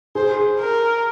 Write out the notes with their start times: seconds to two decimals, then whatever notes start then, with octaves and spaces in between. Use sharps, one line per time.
0.15 G#4 C5
0.60 A#4